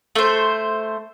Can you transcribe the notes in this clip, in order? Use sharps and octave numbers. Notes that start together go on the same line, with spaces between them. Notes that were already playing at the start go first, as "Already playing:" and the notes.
A3 C5